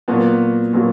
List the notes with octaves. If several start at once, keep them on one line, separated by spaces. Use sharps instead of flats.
A#2 F#3 B3 F#4
A#2 F#3 B3 F#4